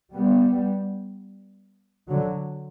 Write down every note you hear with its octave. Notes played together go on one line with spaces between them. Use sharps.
G3 B3
D3 F#3